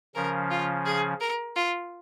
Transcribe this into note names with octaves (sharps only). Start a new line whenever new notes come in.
C#3 F3 C#4 A#4
F4
G#4
A#4
F4